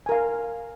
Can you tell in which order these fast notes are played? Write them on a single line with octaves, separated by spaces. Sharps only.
G#5 A#4 F5